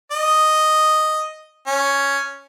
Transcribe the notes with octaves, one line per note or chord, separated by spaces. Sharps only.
D#5
C#4